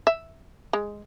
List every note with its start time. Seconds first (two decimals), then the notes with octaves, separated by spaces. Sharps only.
0.07 E5
0.73 G#3